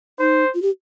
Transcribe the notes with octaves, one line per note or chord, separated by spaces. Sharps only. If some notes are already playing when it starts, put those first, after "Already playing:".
D#4 C5
F4
G4